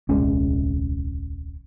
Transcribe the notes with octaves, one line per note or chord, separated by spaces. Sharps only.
D#1 C2 G#3 C#4